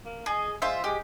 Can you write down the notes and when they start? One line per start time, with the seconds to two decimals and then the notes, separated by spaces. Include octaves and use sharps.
0.05 A#3
0.26 G#4 D#5
0.62 G#3 F4 C5 E5
0.84 G#3 G4